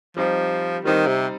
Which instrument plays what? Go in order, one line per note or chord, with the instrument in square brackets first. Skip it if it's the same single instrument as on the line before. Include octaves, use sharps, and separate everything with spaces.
[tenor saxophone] F3 [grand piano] G3 C4 D#4 G4 C5
[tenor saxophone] D#3 [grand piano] G3 C4 D#4 G4 C5
[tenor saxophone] C3